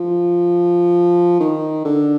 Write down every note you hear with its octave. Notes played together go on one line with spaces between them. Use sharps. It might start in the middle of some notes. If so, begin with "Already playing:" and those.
Already playing: F3
D#3
D3